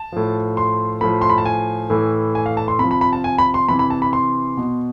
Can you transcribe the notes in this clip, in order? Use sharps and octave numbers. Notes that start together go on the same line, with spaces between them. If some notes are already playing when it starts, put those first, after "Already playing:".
Already playing: A5
A2 F3
C6
A2 F3 B5
C6
B5
A5
G#5
A2 E3
G#5
F5
A5
C6
C3 F3 B5
B5
B5
A5
G#5
B5
C6
C3 E3 B5
B5
A5
B5
C6
B2